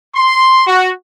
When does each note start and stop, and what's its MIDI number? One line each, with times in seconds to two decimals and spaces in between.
0.15 0.63 84
0.67 0.91 66